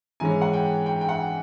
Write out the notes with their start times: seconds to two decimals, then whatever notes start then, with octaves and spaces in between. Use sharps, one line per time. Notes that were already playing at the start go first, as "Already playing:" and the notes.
0.20 G#2 E3 G#3 C#4 G#5
0.41 F#5
0.53 G5
0.86 G5
1.01 G5
1.09 F#5